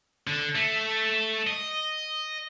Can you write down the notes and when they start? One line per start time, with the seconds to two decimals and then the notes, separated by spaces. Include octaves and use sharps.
0.27 D3
0.56 A3
1.47 D#5